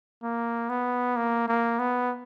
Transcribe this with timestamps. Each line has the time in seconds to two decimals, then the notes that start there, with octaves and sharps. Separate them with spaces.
0.23 A#3
0.69 B3
1.16 A#3
1.48 A#3
1.79 B3